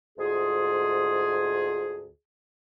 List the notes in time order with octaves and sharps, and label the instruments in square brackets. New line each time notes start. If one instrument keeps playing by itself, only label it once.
[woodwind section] D2 G#2 F4 G#4